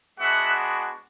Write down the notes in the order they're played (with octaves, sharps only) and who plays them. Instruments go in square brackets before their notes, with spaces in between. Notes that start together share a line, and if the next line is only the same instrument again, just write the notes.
[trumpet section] G#3 B3 D4 F#4 E5 F#5